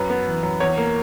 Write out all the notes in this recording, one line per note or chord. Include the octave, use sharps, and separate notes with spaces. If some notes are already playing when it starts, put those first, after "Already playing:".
Already playing: F#2 B4
B3
E3
F#2
E2 C#5
A#3